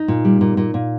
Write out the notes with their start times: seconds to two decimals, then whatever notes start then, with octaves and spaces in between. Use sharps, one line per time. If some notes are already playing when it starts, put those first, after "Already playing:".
Already playing: D#4
0.08 A#2
0.25 G3
0.41 A#2
0.57 A#2
0.74 A#2